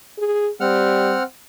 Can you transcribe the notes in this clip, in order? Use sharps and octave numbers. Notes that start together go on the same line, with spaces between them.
G#4
G3 C4 F#5 F6